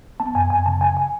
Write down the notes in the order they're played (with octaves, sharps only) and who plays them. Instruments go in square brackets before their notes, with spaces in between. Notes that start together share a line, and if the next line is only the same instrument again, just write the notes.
[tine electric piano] B3 A5
F#2 G#5
F#2 G#5
C#3 A5
C#3 G#5
G#5